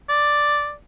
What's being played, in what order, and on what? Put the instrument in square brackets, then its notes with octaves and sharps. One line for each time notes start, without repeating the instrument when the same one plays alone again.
[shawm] D5